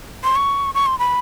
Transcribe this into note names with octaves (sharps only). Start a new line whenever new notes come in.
C6
C#6
C#6
C6
B5